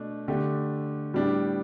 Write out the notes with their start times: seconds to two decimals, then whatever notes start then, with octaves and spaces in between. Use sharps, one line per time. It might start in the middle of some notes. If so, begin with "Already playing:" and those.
Already playing: B2 A3 D4
0.28 D3 A3 D4 G4
1.14 A2 G3 B3 D4 G4